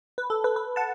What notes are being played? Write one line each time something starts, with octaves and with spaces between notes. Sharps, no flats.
B4
A4
B4
B4
F#5 A5